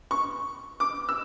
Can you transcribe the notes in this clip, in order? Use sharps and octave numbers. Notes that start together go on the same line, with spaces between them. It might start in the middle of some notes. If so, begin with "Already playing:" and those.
C#6
D6
E6